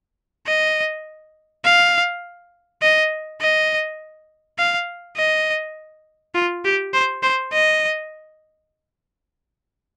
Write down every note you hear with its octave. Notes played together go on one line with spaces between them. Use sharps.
D#5
F5
D#5
D#5
F5
D#5
F4
G4
C5
C5
D#5